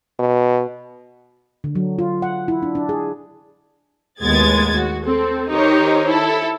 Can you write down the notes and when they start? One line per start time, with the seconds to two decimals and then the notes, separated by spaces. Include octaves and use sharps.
0.20 B2
1.64 D3
1.75 F#3
1.99 F4
2.22 F#5
2.48 E4
2.63 D4
2.75 D4
2.89 G#4
4.22 D#2 A2 G#3 B3 G#6 A6
4.75 F#4
5.05 C4 A4
5.49 D#3 D#4 G4 A#4 C5 C#5
6.08 E4 A4